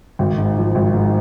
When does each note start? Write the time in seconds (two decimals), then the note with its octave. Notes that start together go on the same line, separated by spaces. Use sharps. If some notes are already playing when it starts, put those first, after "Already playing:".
0.19 G#1
0.38 G#2
0.57 F3
0.75 G#1
0.94 G#2